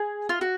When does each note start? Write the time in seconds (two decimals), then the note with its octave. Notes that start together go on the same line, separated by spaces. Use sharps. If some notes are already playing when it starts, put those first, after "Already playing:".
Already playing: G#4
0.29 F4
0.41 F#4